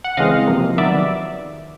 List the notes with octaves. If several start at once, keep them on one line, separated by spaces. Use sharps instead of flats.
F#5
C#3 E3 G#3 C4 D#5 F5
C3 F3 A#3
D#3 F#3 B3 D5 E5